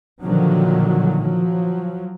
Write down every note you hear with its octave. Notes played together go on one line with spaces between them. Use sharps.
A#2 D3 D#3 F3 F#3
F3 F#3